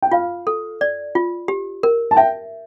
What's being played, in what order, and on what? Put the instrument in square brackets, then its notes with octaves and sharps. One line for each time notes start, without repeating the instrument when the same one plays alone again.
[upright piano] G5
[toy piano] F4 [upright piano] F5
[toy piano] A4
D5
F4
G4
A#4
[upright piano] A5
[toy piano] E5 [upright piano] G5